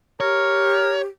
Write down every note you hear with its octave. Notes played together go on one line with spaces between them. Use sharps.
G4 A#4 C#5